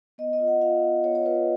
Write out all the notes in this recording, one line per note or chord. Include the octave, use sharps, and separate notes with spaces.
B3 D#5
D#5
F4
F#5
F4 F5
B3
B3 C#5
C#5
F4 B4